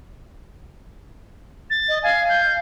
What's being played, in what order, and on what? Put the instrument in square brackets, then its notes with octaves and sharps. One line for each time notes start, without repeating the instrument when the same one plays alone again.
[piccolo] A6
[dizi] D#5
[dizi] F5 [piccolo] G#5
[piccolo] G6